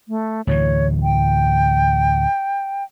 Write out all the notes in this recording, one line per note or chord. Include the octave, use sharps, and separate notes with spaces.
A3
D2 A2 E3 C#5
G5